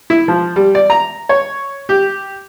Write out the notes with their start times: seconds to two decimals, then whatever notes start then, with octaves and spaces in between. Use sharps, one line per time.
0.10 E4
0.28 F3
0.56 G3
0.75 D5
0.90 A#5
1.29 C#5
1.89 G4